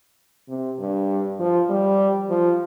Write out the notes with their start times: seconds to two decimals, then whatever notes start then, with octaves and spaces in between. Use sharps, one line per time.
0.49 C3
0.79 G2
1.39 F3
1.69 G3
2.29 F3